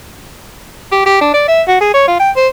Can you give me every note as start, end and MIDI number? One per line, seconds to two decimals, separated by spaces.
0.92 1.01 67
1.06 1.18 67
1.21 1.29 62
1.34 1.44 74
1.48 1.62 76
1.68 1.77 66
1.81 1.92 68
1.94 2.03 73
2.07 2.15 65
2.20 2.30 79
2.36 2.47 72